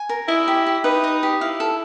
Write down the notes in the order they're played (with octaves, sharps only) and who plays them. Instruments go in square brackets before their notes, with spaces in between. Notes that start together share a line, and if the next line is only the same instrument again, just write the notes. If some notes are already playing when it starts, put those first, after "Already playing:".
Already playing: [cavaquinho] G#5
A#4
[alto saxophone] E4 [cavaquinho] D#5
[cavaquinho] G4
G4
[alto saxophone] D#4 [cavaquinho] B4
[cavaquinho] D#5
G4
[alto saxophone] E4 [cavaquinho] F5
[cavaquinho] A4